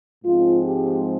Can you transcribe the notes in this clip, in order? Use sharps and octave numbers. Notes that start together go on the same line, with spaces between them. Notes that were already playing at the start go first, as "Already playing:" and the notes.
G#2 F3 G#3 C4 F4
G4